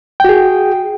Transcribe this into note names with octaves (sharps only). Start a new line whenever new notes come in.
F#4 G#4 G5